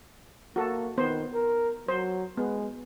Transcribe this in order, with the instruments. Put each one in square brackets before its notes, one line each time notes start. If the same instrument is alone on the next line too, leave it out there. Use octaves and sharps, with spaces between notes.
[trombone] A#3 [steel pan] F#4 A4
[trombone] D#3 [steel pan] B3 C5
[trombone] A#4
[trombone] F#3 [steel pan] C5
[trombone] G#3 [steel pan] B3